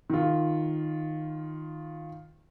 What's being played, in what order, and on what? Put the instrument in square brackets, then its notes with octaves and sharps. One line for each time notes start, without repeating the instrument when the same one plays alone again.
[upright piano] D#3 F4